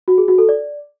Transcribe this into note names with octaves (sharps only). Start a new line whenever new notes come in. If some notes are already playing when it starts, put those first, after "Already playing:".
F#4
G#4
F#4
A4
D5